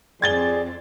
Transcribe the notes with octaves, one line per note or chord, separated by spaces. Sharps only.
F2 C4 G#4 D5 G#6 A6 G7